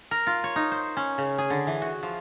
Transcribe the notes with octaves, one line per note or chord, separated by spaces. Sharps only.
A#4
F4
C#5
D#4
C5
C#4
C#3
G#4
D3
E3
F#4
F3